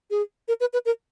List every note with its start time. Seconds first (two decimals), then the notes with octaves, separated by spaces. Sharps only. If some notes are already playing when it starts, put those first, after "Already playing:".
0.11 G#4
0.48 A#4
0.60 B4
0.73 B4
0.85 A#4